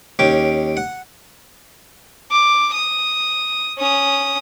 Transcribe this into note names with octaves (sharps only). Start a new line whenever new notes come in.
D#2 C#4 G5 D6
F#5
D6
D#6
C#4 D#6